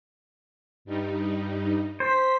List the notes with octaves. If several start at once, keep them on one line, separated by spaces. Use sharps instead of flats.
G2 G3 D#4
C5 B6